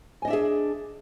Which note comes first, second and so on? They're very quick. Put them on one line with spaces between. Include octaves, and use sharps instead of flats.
G#5 D#5 D4 E5 G#4